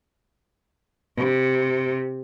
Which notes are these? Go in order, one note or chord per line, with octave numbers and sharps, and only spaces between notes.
C3